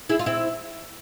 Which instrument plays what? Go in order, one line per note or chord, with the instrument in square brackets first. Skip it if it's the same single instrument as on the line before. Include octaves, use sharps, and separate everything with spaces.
[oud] E4 G#4
F4
C4 E4